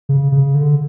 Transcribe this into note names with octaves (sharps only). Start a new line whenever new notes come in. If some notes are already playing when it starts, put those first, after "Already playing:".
C#3
C#3
D3